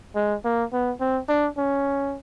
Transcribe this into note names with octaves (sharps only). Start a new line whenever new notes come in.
G#3
A#3
B3
C4
D4
C#4